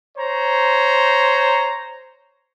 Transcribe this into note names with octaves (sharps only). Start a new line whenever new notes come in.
C5 C#5 A#5